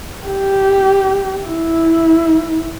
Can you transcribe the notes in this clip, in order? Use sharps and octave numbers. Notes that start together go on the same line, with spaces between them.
G4
E4